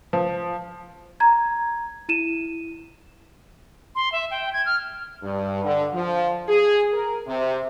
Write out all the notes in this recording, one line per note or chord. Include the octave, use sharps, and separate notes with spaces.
F3
A#5 G#6
E4 D#7 E7
C6
E5
G5
G#6
F6
G2
D3
F3
G#4
A#4
C3